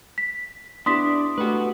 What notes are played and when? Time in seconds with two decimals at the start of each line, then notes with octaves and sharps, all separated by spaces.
0.18 B6
0.86 B3 D4 E4 G4 C6 D#6 B6
1.38 A3 F#4 G4 B4